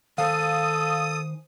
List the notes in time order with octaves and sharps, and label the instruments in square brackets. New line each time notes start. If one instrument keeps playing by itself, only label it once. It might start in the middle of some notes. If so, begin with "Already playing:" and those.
[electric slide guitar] D#3 C5 [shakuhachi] A4 [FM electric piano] F5 [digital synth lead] D#6